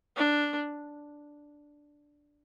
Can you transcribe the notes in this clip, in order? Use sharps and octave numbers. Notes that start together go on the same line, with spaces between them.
D4